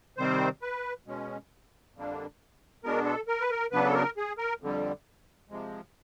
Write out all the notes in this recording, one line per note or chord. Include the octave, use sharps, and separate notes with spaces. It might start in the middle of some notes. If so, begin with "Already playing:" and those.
C3 D#3 G3 C4 C5
B4
B2 G#3 C#4
F2 D3 G3 A#3 D4
B2 G#3 B3 D4 A#4
A4
A#4
B4
A#4
C#3 F#3 B3 D4 B4
A4
A#4
G#4
A#4
F2 D3 G3
C3 F3 G#3